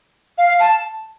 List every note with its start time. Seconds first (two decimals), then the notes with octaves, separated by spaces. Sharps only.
0.38 F5
0.60 A5